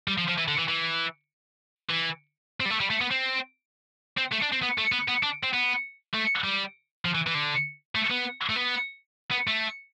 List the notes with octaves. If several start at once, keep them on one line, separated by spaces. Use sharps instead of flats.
G3
F3
F3
E3
D3
E3
E3
E3
C4
G3
A3
G3
A3
B3
C4
C4
A3
D4
C4
B3
A3
B3
B3
D4
C4
B3
A3
G3
F3
E3
E3
D3
A3
B3
A3
B3
B3
A3